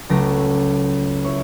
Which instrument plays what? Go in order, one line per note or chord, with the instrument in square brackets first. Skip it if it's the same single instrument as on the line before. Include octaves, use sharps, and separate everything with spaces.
[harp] C#2 F#3 A3 A#6 D7
E4 C#5